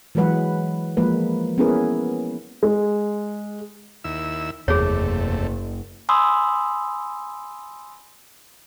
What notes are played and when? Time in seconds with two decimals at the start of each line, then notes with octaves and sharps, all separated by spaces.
0.15 E3 F#3 G#3 B4 F#5
0.97 F3 G#3 A#3 B4
1.58 B3 C#4 E4 G#4 A#4 B4
2.63 G#3
4.04 D#2 E4 E6
4.68 F#1 E2 C3 A3 G#4 C#5
6.09 G#5 B5 C6 D#6 E6